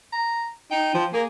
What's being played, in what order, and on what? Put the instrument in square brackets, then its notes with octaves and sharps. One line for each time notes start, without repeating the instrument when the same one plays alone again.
[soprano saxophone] A#5
[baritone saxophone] D#4 [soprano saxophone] G5
[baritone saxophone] F3
[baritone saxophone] A#3 [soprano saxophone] G#4